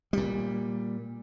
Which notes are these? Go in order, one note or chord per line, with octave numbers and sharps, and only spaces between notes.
A#2 G3